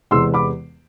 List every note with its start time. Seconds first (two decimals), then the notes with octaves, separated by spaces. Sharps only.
0.11 E2 C3 G#3 B3 C6 E6
0.34 B5 D6